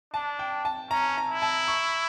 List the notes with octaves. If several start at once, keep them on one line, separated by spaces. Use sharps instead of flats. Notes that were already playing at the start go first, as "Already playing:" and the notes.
D4 A5
G5
A5
C#4 A#5
A#5
E4
A5
C#6